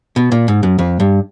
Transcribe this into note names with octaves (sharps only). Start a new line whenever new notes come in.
B2
A#2
G#2
F#2
F2
G2